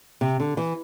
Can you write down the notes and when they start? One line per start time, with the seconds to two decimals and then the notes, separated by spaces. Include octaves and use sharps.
0.21 C3
0.40 D3
0.57 E3